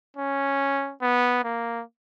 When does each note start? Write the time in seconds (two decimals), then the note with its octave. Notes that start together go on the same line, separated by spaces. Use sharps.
0.17 C#4
1.02 B3
1.44 A#3